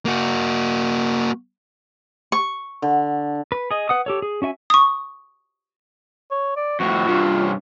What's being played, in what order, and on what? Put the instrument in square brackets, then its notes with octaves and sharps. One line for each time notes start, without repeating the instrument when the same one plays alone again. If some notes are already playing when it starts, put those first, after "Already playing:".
[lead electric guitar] A#3 F#4
[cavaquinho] C#6
[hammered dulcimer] D3
[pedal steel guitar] B4
G#4 D#5
B4 F#5 D#6
G4 A4 C#5
G#4
C#4 F#4 E5 G#5
[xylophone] C#6 D#6
[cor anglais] C#5
D5
[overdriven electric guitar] F2 A2 [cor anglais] F#4
[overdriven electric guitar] G2 C3 [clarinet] F4
[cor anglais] C#4